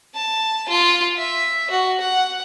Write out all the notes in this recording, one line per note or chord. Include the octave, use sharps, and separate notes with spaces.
A5
F4
E5
F#4
F#5